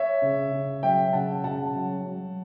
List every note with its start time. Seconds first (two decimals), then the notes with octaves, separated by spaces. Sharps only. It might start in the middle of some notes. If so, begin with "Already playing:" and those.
Already playing: C#5 E5
0.22 C#3
0.52 C#3
0.83 F#3 E5 G5
1.13 C#3 F#5 A5
1.44 C#3 F#5 A5
1.75 F#3
2.06 F#3